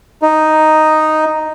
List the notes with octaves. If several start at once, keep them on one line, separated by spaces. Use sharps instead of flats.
D#4